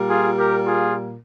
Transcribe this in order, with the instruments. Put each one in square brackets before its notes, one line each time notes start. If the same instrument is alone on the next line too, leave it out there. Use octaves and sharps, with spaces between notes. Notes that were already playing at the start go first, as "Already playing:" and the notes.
Already playing: [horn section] A#2 G3 A#3
F4 G#4
G4 A#4
F4 G#4